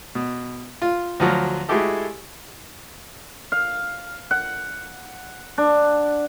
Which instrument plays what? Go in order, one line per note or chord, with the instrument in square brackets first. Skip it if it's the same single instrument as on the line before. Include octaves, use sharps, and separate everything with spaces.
[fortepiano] B2
F4
D2 F3 F#3
G#3 A3 E4 F#4 G4 A4
[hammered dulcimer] F5
F#5
D4